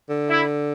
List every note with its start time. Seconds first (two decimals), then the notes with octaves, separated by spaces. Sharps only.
0.09 D3
0.29 E4